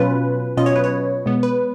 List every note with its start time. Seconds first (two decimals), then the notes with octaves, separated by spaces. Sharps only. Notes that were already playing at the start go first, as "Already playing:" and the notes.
Already playing: B2 F#3 C#4 F4 B4
0.57 B2 F#3 C#4 F4 D#5
0.66 C#5
0.76 B4
0.84 C#5
1.26 B2 G#3 B3
1.43 B4